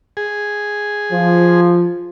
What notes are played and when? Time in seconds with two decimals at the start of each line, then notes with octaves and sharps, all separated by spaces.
0.17 G#4
1.12 F3